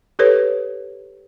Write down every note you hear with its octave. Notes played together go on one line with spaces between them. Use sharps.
G4 A4 B4 C#5